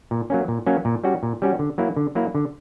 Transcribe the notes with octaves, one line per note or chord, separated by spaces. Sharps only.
A#2
F#3 A#3 C#4
A#2
F#3 A#3 C#4
A#2
G3 C#4 F#4
A#2
G3 C#4 F#4
D3
F#3 A#3 E4
D3
F#3 A#3 E4
D3